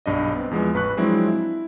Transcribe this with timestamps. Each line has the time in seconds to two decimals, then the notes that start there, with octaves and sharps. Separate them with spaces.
0.06 B1 G2 D4 D#5
0.35 B3 C4
0.51 E2 F3 G#3 B3
0.74 A1 B4 B5 C#6 F#6
0.97 F3 F#3 G#3 C4 D4 E4
1.28 E4